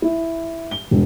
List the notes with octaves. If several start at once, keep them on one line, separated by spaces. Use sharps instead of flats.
E4
G7
E1